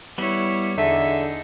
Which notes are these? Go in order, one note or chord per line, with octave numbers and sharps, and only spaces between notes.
G3 B3 E4 C#5
E2 D3 D#4 G#4 A4 E5